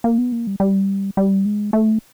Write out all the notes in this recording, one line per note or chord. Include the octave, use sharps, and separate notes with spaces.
A#3
B3
A#3
G3
G3
G3
G#3
A3